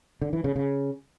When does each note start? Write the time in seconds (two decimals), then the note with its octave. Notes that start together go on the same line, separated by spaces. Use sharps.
0.22 D3
0.33 E3
0.44 C#3
0.56 C#3